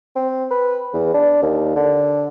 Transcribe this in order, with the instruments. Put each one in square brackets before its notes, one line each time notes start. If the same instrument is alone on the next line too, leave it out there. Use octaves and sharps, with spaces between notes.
[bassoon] C4
B4
E2
D4
D#2
D3